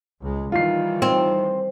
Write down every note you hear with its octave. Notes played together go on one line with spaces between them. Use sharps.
C#2 G#3
D#3 E3 G3 F4 C7
C4